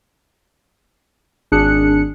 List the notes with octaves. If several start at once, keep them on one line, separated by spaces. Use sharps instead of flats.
G#1 D4 G#4 F#6 C#7